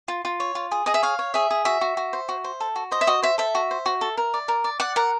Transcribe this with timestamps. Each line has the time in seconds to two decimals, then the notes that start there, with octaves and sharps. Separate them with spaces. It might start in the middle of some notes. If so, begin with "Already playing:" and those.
0.08 F4
0.25 F4
0.40 C#5
0.55 F4
0.71 G#4
0.86 G#4 D#5
0.94 E5
1.03 C#5 F5
1.19 C#5
1.34 G#4 E5
1.51 G#4
1.65 F#4 E5
1.81 F#4
1.97 F#4
2.13 C5
2.29 F#4
2.44 C5
2.60 A4
2.76 F#4
2.91 C5 D#5
3.01 E5
3.07 F#4 D#5
3.22 C5 E5
3.38 A4 E5
3.55 F#4
3.71 C5
3.86 F#4
4.01 A4
4.17 A#4
4.34 D5
4.48 A#4
4.64 D5
4.80 D5 F#5
4.96 A#4 F#5